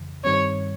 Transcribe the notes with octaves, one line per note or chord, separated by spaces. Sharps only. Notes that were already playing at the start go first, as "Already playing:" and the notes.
Already playing: F2 C#3 E3
G2 D#3 G3 C4 C#5